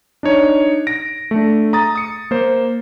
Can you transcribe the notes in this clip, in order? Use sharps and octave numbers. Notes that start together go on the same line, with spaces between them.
D4 D#4 C#5
A#6 D7
A3 D4
A#5 D#6 A6
D#6 C#7
A#3 C5